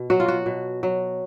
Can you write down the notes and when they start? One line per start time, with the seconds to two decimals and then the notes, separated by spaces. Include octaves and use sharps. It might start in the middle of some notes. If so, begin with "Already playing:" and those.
Already playing: B2
0.10 F#3 F#4
0.20 F4
0.28 F#4
0.46 B2
0.83 F#3